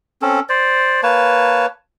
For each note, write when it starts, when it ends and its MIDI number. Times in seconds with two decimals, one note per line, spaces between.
0.22 0.40 60
0.22 0.40 61
0.22 0.40 69
0.49 1.01 72
0.49 1.01 74
1.03 1.66 58
1.03 1.66 71
1.03 1.66 73
1.03 1.66 81